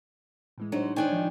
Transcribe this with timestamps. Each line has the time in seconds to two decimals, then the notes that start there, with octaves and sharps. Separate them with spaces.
0.58 A2 E3 G#3
0.72 F#3 D4 D#4 C5
0.96 D#3 D4 D#4 C#5 G5 G#5
1.12 F3